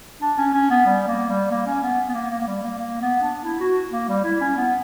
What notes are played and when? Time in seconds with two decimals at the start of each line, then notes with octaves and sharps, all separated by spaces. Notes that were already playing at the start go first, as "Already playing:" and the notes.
0.22 D4
0.38 C#4
0.54 C#4
0.70 B3
0.86 G3
1.07 A#3
1.30 G3
1.51 A#3
1.67 C#4
1.83 B3
2.09 B3
2.15 A#3
2.31 A#3
2.41 A#3
2.47 G3
2.63 A#3
2.79 A#3
3.01 B3
3.22 D4
3.44 E4
3.60 F#4
3.92 A#3
4.09 G3
4.24 E4
4.41 C#4
4.57 B3